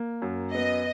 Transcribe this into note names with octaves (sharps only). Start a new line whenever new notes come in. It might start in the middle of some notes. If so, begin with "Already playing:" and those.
Already playing: A#3
F#2
B3 D#5